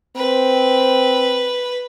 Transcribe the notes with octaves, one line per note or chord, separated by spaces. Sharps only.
C4 B4